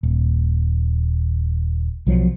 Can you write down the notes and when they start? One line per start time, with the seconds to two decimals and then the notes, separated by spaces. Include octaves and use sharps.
0.03 D#1
2.07 B1 F3 F#3